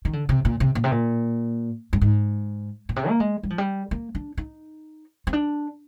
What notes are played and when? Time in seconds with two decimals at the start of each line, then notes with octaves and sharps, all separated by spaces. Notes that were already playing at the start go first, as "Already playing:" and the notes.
0.05 D#3
0.13 D3
0.29 C3
0.45 A#2
0.60 C3
0.75 A#2
0.84 C3
0.91 A#2
1.93 G2
2.01 G#2
2.89 A#2
2.96 C3
3.09 A#3
3.20 G#3
3.43 G3
3.50 F3
3.58 G3
3.91 A#3
4.15 D4
4.38 D#4
5.27 C4
5.33 D4